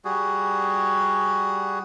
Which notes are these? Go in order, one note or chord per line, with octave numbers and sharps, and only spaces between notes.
G3 F#4 G#4